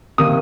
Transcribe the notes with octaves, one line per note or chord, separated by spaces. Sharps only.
C3 D#3 A#3 D#6